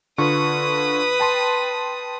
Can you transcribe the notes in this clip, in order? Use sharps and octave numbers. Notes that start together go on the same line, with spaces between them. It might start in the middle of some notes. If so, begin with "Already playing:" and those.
D3 F4 B4 C#6 D#6
G5 A5 C6